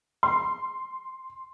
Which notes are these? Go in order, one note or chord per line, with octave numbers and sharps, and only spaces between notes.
C6